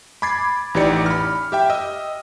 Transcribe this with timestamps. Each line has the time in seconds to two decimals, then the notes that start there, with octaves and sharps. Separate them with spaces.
0.22 B5 D6 G#6 A6 C7
0.74 A1 E3 D#4 G4 D5 C#7
1.06 B5 F6
1.52 G4 E5 G5
1.70 D#5 E6